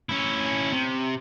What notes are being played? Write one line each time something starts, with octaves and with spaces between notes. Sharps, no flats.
C#4 E4
C3